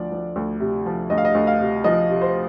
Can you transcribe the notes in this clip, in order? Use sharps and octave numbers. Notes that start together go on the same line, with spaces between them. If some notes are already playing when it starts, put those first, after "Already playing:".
Already playing: D2 F3 D5
F3
D2
C3
F3
D2 D#5
F5
D#5
D2
F5
C3
F3 D#5
C3
C5